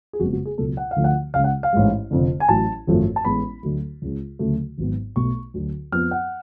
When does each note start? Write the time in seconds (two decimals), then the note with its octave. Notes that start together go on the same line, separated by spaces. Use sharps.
0.13 G#4
0.20 F#1 F2 C#3 G#3 B3 F#4
0.33 F#4
0.45 G#4
0.58 C#2 B2 F#3 A4
0.77 F#5
0.91 F5
0.96 D2 D3 F3 A3
1.04 F#5
1.34 C#2 C#3 G#3 F5
1.44 F#5
1.63 F5
1.73 A1 G#2 G#3
2.11 F1 F2 D3
2.40 G#5
2.49 A1 A2 F#3 A5
2.87 G#1 F#2 F3 A3
3.16 A5
3.25 A1 A2 G#3 B3 B5
3.63 D2 D3 F#3 A3
4.02 C#2 C#3 G#3
4.39 D2 C#3 F#3 A3
4.78 G#1 G#2 F#3 B3
5.16 B1 B2 A3 C#6
5.54 D2 D3 F#3
5.92 F2 F3 B3 F6
6.11 F#5